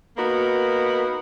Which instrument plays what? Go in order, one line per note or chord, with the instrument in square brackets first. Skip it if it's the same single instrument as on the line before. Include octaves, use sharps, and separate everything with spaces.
[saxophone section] A#3 B3 D#4 F#4 A#4